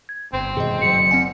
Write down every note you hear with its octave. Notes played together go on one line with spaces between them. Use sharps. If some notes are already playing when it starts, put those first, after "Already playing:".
G#6
G1 C4
G2 B2 D#3 G#4 D#5
F#1 F#3 C#7
C4 F#5 G#5